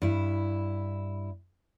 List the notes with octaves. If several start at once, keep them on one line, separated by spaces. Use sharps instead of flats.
G2 E4